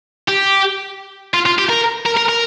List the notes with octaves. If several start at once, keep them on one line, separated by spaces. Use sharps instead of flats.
G4
F4
F4
G4
A#4
A#4
A#4
A#4